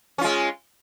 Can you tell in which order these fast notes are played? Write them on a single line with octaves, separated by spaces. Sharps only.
C#4 F4 G#3